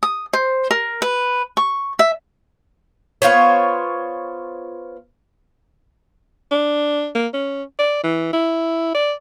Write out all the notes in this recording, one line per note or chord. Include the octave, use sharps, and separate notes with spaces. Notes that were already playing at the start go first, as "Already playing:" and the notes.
D#6
C5
A#4
B4
C#6
E5
B3 F4 C5 C#5
D4
A#3
C#4
D5
E3
E4
D5